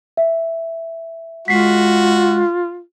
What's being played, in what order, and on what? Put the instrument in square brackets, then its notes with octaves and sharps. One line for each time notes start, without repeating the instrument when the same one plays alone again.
[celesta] E5
[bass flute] G#3 [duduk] F4 [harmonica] F#4 [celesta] B6 C7